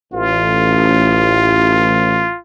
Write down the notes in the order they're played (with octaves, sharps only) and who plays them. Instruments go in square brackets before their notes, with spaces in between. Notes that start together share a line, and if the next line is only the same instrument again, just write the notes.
[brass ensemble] A1 [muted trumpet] F4